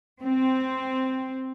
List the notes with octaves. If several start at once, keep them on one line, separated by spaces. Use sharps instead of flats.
C4